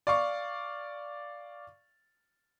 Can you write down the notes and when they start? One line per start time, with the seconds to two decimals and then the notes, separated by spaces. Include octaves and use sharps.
0.07 D5 F5 C#6